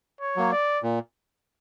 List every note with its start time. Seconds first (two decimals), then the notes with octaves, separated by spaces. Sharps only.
0.21 C#5
0.36 F#3 A#3
0.52 D5
0.83 A#2